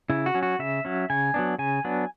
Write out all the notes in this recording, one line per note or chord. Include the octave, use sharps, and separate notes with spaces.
C#3 E4
F#4
F#3 C#4
F#4
C#3 E5
F#3 C#4
C#3 G#5
F#3 B3 D4
C#3 G#5
F#3 B3 D4